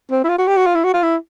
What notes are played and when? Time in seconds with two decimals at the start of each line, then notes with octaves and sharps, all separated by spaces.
0.10 C4
0.24 E4
0.29 F4
0.38 F#4
0.47 G4
0.57 F#4
0.66 F4
0.75 E4
0.84 F#4
0.94 F4
1.03 E4